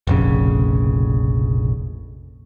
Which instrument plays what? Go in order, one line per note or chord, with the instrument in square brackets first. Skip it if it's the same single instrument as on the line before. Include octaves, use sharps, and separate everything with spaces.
[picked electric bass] F1 A#1 C#3